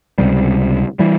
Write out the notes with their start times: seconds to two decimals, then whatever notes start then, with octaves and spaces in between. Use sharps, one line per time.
0.18 C#2 C3 G3
0.99 E3 G3